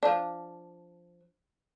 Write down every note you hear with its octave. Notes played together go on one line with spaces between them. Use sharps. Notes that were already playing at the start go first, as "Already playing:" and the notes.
F3 D4